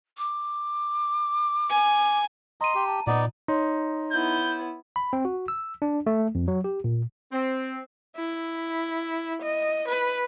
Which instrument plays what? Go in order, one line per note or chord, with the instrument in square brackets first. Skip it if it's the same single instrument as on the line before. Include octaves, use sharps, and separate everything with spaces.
[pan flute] D6
[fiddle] G#5
[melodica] D#5 [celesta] A#5 D#7 [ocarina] C6
[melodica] G4
[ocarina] A5
[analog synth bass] A#2 [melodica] B3 D#4 D5 [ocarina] F#5
[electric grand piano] D#4 [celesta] C#5 C6
[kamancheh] B3 E4 [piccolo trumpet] G6
[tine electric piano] B5
C4
F#4
E6
D4
A3
F2
F#3
G4
A#2
[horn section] C4
[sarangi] E4
D#5
B4